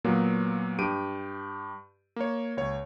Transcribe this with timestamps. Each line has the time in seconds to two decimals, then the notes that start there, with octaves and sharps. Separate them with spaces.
0.04 A#2 F#3 A#3 B3
0.78 G2 G4 D7 D#7
2.16 A#3 C#5
2.57 C#2 C#5